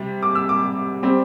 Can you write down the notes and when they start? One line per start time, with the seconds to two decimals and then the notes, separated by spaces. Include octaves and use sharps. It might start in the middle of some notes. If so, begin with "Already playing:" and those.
Already playing: C3 G3
0.23 D6
0.35 E6
0.49 D6
1.03 G3 C4